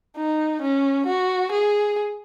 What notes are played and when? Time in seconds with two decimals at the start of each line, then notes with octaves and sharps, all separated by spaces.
0.17 D#4
0.62 C#4
1.06 F#4
1.52 G#4